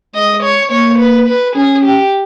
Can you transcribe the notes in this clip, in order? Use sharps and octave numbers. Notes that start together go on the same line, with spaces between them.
G#3 D#5
C#5
A#3 C#5
B4
B4
C#4 G#4
G4